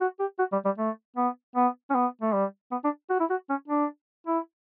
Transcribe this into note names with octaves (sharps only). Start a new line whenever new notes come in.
F#4
G4
F#4
G3
G3
A3
B3
B3
C#4
B3
A3
G3
B3
D4
F#4
E4
F#4
C#4
D4
E4